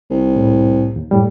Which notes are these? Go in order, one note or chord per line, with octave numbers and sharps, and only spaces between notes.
C2
A2
D#2
F#2 A2 G3